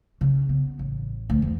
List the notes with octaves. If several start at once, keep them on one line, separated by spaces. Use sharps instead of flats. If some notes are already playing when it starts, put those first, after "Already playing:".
C#3
B3
A1
D2
E2